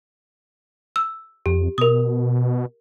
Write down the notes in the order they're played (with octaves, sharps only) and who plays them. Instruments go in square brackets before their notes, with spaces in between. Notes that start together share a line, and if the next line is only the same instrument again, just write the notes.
[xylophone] E6
[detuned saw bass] F2 [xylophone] G4
[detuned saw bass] B2 [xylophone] A#4 D#6